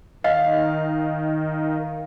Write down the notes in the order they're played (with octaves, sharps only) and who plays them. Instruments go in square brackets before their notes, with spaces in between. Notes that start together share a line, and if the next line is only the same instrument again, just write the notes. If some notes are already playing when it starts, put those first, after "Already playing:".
[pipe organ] D#3 [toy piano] D#5 [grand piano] F5